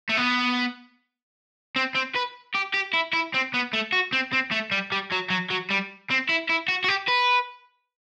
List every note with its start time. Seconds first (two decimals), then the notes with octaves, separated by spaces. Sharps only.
0.10 A3
0.17 B3
1.76 C4
1.95 C4
2.15 B4
2.54 G4
2.74 G4
2.93 E4
3.13 E4
3.34 C4
3.54 B3
3.73 A3
3.92 F#4
4.13 C4
4.33 C4
4.51 A3
4.71 G3
4.92 G3
5.12 F#3
5.30 F#3
5.50 F#3
5.71 G3
6.10 C4
6.29 E4
6.49 E4
6.68 F#4
6.84 F#4
6.88 G4
7.08 B4